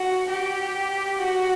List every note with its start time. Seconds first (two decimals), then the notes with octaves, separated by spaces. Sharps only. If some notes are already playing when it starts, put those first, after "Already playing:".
Already playing: F#4
0.30 G4
1.19 F#4